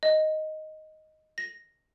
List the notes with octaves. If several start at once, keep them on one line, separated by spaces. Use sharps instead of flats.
D#5
A#6